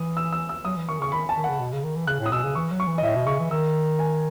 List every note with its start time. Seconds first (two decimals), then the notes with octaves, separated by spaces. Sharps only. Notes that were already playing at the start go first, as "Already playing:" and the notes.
Already playing: E3 D#6
0.17 E6
0.32 E6
0.49 E6
0.65 F#3 D#6
0.77 E3
0.89 D#3 C#6
1.00 C#3 C#6
1.12 D#3 B5
1.29 A5
1.36 D#3
1.44 F#5
1.49 C#3
1.60 B2
1.73 C#3
1.84 D#3
1.96 E3
2.07 C#3 F#6
2.20 A2
2.26 D#6
2.32 B2 E6
2.44 C#3
2.55 E3 C#6
2.72 F#3
2.80 C#6
2.88 E3
2.98 D#5
3.03 A2 E5
3.16 B2
3.26 C#3 C#6
3.39 E3
3.51 D#3 E6
3.99 G#5